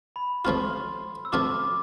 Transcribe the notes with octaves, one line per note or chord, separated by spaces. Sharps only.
B5
F3 A3 C4 F4 C6
E6
F3 A3 C4 F4 D6